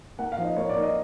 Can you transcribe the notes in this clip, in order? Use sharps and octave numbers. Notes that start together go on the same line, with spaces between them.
A#3 F#5
F5
F3
D#5
A#3 C#5
D5
A#3
D#5